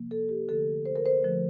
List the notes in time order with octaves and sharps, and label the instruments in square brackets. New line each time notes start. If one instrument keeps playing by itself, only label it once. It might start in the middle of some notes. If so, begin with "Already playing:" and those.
Already playing: [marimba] C3 F3 A#3
A4
G4
D3 F3 A3 A4
C5
A#4
C5
D3 F3 A3